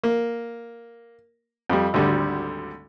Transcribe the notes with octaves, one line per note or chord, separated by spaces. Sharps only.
A#3
F2 G3
G#1 D2 D3 G3